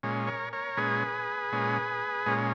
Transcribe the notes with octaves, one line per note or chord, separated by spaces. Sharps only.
A#2 G#3 C#4
A#4 C#5
A#4 C#5
A#2 G#3 C#4 G#4 B4
A#2 G#3 C#4
A#2 G#3 C#4